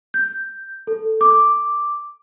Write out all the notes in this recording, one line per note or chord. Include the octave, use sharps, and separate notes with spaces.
G6
A4
D6